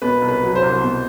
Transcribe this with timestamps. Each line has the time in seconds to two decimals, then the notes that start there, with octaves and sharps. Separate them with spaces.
0.02 B2 B4
0.22 C2
0.28 B4
0.42 F#3
0.55 C5
0.62 C2
0.81 B2